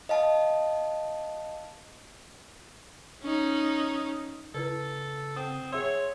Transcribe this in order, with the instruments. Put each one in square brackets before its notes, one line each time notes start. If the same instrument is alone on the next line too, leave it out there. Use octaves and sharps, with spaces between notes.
[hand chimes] D#5 F5 A5
[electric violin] C#4 D#4
[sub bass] C#3 [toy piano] E4 B4 D5 [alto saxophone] A4
[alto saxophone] C4 [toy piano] F#5 [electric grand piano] D#6
[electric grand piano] G#4 E5 C6 [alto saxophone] C#5 [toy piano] F#5 G#5 E6